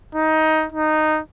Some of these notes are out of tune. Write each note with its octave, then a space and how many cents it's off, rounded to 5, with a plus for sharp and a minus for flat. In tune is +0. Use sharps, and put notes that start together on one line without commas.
D#4 +15
D#4 -10